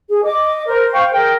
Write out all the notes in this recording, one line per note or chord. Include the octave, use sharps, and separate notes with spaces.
G#4
D#5 D6
A#4 C5
F5 G5 C#6
G#4 A#4 G5